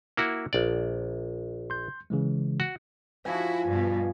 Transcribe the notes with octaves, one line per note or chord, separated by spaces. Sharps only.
A#3 E4 F#4
A#1 D5
C6 G6
C#3 E3 G#3
F#4
F3 E4 F#4 G#5
G2 B2